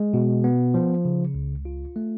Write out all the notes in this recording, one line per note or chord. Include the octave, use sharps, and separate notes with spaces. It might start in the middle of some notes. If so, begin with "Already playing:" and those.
Already playing: G#3
B2
B3
F3
C#3
C#2
F4
A3